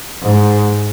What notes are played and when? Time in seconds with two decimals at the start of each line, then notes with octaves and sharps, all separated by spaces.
0.21 G#2